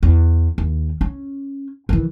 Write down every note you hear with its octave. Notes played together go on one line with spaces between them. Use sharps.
E2
D#2
C#4
D#3 E3